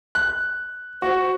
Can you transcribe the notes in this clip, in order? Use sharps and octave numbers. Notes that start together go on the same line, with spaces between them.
F#6
F#4 C5